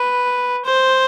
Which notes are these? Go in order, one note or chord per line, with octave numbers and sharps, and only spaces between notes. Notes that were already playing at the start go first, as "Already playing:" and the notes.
Already playing: B4
C5